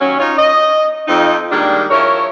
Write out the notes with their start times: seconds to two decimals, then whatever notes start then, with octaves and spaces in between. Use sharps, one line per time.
0.01 D#2 F#3 C#4
0.20 D#4 F4 C#5
0.37 D#5
1.08 F2 D#4
1.51 D#3 G3 G#3 A#3 D4
1.91 F3 E4 A#4 C#5